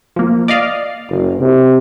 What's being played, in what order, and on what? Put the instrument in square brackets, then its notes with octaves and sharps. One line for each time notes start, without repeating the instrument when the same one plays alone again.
[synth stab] F3 A#3
D5 D#5 F5
[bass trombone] F#1
C3